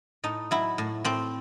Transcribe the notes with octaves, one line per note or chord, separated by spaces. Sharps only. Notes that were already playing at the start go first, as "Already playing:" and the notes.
A2 D#4
F#3 E4
A2
A2 C4